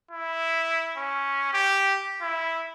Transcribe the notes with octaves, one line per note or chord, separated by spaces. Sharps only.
E4
C#4
G4
E4